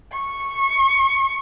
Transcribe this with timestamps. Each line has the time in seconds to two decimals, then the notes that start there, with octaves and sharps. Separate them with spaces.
0.13 C#6